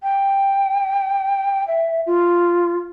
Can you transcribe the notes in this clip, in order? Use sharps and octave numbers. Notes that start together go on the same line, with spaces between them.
G5
E5
F4